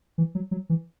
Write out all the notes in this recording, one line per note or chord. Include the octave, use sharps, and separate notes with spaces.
E3
F#3
F#3
E3